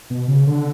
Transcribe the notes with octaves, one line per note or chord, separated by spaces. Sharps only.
B2
C#3
D3